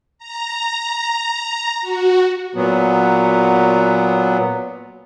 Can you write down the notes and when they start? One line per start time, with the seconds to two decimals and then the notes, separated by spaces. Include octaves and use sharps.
0.18 A#5
1.81 F#4
2.55 A#2 F#3 B3